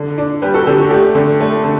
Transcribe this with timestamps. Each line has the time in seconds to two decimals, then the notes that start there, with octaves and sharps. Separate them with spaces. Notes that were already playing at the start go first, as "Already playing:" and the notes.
Already playing: D3
0.18 D4
0.42 G3 G4 B4
0.54 F#4 A4
0.67 D3 G4
0.79 F#4
0.90 A3 G4
1.15 D3
1.41 A3
1.64 D3